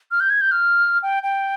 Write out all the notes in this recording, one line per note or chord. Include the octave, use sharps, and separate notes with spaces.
F6
G6
G#6
G6
F6
G5
G5